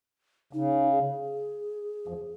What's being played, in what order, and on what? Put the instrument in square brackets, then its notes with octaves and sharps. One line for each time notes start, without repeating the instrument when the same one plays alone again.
[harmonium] C#3 [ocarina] D#4
[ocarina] G#4
[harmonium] F2 F3